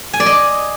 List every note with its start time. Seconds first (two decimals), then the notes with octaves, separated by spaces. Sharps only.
0.13 G#5
0.20 D5
0.26 D#5